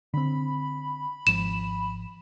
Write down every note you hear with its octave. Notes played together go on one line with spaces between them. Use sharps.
D3 C4 B5
G#1 F3 E7